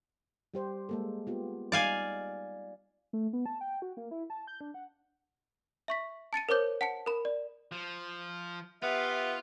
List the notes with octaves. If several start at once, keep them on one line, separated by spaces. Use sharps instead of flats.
G3 G4 C5
G#3 A#3 A4
B3 F4 G4
G3 D#4 D5 F5 G#5
A3
B3
A5
G5
F#4
A#3
E4
A5
G6
D4
F#5
E5 C#6 B6
A5 A6 C#7 D#7
A#4 C5 C#5 D6 G6
F#5 A5 C#7
A#4 B5
D5
F3
B3 F4 G4 E5